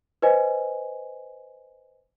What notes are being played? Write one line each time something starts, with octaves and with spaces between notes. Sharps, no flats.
B4 C5 D#5 G#5